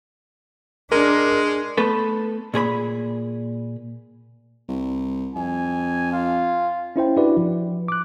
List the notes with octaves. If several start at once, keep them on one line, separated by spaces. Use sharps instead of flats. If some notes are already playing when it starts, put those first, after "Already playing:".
G#3 D4 A#4
A3 B3 A4 B4
A#2 G#4 C#5 B5
C2
F2 G#5
F4
C#4 E4 C5 G5
D4 E4 F#4 G4 B4 D5
F3
D6 F#6